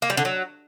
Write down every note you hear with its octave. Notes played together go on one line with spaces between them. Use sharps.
A#3
G3
D3
F#3